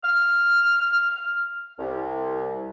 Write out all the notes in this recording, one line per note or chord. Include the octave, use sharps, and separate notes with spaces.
F6
C2